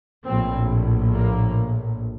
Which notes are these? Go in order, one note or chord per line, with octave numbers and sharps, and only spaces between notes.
A#1 A2 C4
A#3